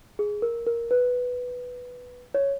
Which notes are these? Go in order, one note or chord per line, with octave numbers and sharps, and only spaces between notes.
G#4
A#4
A#4
B4
C#5